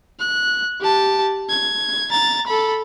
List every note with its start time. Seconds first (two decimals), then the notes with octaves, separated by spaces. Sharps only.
0.20 F#6
0.81 G4 A5
1.49 G#6
2.11 A#5 A6
2.47 A4 B5